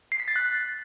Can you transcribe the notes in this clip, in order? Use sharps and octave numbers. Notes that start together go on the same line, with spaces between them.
C7
B6
A6
F#6